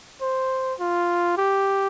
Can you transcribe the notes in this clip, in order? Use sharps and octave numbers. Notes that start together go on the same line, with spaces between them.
C5
F4
G4